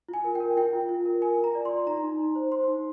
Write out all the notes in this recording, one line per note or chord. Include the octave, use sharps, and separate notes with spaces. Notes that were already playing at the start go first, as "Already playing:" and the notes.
F4
G#5
A#4
G5
A#4
F4 G5
F4
F4
A#4
A#4 G#5
F4
A#5
D5
C6
D5
D#4 A#5
D#4
D#4
C5
C5 C6
D#4